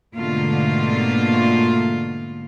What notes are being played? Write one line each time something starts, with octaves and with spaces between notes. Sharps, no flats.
G#2 B2 D3 A3 A#3 F4